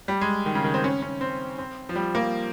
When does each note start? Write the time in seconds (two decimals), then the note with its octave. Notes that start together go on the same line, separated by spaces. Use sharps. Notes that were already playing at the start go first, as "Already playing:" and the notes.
0.08 G3
0.21 G#3
0.46 D#3
0.55 C#3
0.64 D#3
0.74 C4
0.84 C#4
1.02 C#4
1.21 C4
1.58 C4
1.89 F3
1.96 G3
2.15 A#3